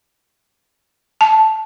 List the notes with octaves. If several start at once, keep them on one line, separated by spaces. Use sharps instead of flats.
A5